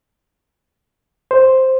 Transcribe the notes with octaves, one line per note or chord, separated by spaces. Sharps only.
C5